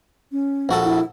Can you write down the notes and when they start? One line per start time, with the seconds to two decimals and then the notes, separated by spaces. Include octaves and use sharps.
0.32 C#4
0.69 A#1 F#4 A4
0.84 E4